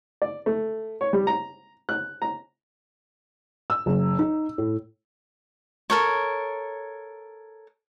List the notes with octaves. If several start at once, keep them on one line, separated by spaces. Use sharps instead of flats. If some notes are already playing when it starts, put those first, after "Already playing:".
D5
A3
C#5
G3
A#5
F#6
A#5
E6
F#1
D#4
A2
A4 A#4 C#5